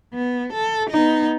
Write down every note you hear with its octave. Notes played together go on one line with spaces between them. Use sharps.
B3
A4
B3 D#4